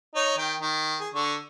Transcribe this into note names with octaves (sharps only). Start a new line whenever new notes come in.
D#4 C#5
D#3 G5
D#3
G#4
D3 C#6